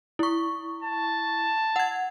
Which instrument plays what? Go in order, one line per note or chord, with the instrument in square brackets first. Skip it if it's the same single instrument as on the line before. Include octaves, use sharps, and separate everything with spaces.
[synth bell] E4 C#6
[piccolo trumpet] A5
[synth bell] F#5 G#6